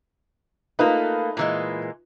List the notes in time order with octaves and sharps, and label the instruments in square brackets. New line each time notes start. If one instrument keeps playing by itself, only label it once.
[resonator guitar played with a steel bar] A3 A#3 [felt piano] D#4 F4 B4
[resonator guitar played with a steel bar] A#2 E3 G#3